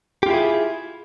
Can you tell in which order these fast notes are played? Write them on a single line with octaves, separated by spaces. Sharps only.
G4 F4 E4 G#4